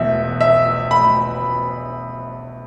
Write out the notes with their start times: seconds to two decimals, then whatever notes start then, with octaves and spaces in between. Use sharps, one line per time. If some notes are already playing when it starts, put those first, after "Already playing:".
Already playing: E1 E2 B2 A3 E5
0.41 E5
0.91 B5